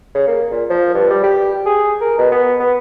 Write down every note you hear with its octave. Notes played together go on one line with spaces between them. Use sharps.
C#3
A#3
A#2
F3
G2
G3
G4
G#4
A#4
B2
B3
B3